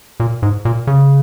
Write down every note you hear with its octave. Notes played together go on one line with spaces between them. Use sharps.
A#2
G#2
A#2
C#3